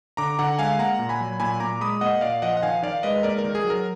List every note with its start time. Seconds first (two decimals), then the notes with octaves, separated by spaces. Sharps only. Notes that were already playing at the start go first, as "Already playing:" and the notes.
0.17 D3 A#5 D6
0.39 D3 F#5 A#5
0.59 G#3 F5 G#5
0.78 A#3 F#5 A#5
0.99 A#2
1.09 G#5 B5
1.20 F#3
1.40 A#2 G#5 B5
1.60 A#2 A#5 D6
1.81 G#3 B5 D#6
2.01 A#3 D#5 F#5
2.21 A#2 D5 F5
2.42 F3 D#5 F#5
2.57 F#5
2.63 D#3 F5 G#5
2.83 D#3 D5 F5
3.03 G#3 B4 D#5
3.23 A#3 A#4 D5
3.38 A#4
3.44 D#3
3.55 G#4
3.64 F#3
3.70 A#4